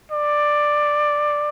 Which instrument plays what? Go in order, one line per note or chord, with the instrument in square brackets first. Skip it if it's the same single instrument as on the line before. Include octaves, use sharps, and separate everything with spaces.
[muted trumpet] D5